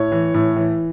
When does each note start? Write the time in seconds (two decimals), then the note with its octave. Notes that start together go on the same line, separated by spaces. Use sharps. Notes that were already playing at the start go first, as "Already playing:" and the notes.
Already playing: A2 C#5
0.12 E3
0.34 A2
0.56 E3